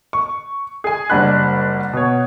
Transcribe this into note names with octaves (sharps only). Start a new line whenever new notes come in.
C#6
G#4 G#5
F#1 G3 D4 F#5 B5 F#6
B2 C#5